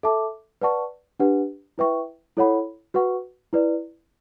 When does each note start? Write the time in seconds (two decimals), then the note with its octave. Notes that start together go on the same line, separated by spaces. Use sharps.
0.03 A4 E5 A5 D6
0.61 B4 D5 F#5 A5 C#6
1.20 D4 G4 B4 F#5
1.78 E4 B4 E5 G5 C#6
2.37 E4 A4 C#5 F#5 B5
2.94 F#4 B4 F#5 C#6
3.53 E4 B4 D5